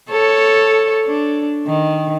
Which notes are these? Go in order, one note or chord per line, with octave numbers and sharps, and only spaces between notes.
A4 C#5
D4
D#3